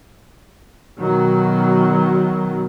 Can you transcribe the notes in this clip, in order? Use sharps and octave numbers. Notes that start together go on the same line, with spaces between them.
B2 D#3 F#3